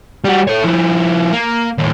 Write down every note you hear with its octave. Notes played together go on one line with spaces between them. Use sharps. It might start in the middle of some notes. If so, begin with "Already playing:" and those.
G3 F#4
A4 C#5
F3 E4
A#3
D#2 A2